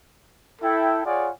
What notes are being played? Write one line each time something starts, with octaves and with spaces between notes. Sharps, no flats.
E4 A4 G5
F4 G#4 C#5 D5 F#5 G#5